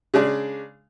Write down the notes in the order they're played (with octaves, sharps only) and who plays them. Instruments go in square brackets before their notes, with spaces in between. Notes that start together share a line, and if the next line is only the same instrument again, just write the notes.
[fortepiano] C#3 G#3 D4